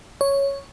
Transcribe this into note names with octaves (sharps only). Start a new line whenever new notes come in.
C#5